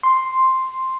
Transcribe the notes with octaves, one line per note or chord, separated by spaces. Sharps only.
C6